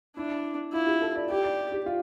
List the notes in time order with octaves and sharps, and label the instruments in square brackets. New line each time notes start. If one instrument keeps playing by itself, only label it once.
[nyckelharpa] D4 [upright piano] E4
[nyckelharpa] E4 [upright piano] F4
[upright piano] G4
A4
D5
[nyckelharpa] G4 [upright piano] D5
[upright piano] D5
G4
F4